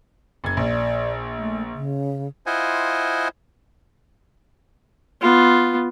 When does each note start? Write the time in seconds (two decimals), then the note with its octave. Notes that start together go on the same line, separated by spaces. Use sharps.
0.44 F#1 G#6
0.57 A#1 D5
1.38 A3
1.74 C#3
2.46 E4 F4 C5 D#5 F#5 G#5
5.21 B3 F4